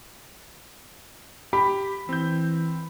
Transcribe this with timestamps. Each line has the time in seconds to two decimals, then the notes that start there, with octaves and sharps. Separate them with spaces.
1.53 G4 B5
2.09 E3 C4 G6